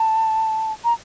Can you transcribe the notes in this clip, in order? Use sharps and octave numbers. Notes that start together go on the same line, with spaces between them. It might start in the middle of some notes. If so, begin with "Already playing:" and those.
Already playing: A5
A#5